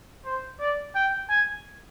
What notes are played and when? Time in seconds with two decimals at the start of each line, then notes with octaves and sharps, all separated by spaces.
0.25 C5
0.60 D5
0.95 G5
1.30 G#5